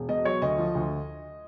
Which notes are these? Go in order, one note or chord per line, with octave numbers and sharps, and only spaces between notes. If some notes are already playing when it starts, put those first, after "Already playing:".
Already playing: E1
B2 D#5
F#3 C#5
D2 D#5
F3
D2